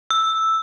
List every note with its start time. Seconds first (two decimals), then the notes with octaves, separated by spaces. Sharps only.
0.10 E6